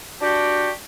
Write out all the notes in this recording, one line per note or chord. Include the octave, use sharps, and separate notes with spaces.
D4 F#4 G4